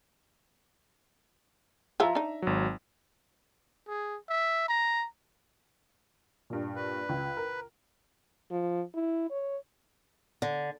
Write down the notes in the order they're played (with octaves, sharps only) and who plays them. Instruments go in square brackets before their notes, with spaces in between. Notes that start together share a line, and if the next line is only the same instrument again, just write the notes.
[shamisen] F3 E4 F4 [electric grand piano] E5 A#5
[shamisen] D4 D#4
[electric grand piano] G#1 F#3
[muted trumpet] G#4
E5
A#5
[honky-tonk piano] G2 A#2
[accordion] B4
[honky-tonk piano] C#2
A#4
[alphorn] F3
E4
C#5
[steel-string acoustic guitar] D3